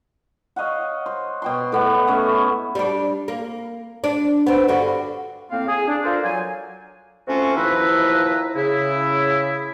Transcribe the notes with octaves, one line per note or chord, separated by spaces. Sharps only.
C#5 D#5 F5 F#5
C5
B2 G5 C6
A2 B3 F#5
A3 C#4 E5
G3 D4
A#3
D4
B3 C4
G2 D3 F#4
A2 A#3 C4 F5
G#4
D4
F4 A4 A#4 C5 D5
F#3 G#5
A3 C4 C#4 F4 F#4
D#2 F3 E4 B4 E5 A#5
C#3 E4